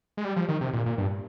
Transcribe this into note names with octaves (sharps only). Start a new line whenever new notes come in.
G#3
G3
F3
D#3
C3
A#2
A#2
G2